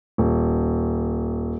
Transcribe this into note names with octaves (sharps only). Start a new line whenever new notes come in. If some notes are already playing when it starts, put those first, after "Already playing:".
D#1